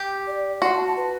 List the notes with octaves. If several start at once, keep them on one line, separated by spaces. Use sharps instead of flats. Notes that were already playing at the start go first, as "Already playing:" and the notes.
Already playing: G4
D5
F#4 C6
A5
A5
B4